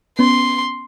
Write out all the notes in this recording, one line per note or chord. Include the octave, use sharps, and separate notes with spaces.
B3 C#4 C6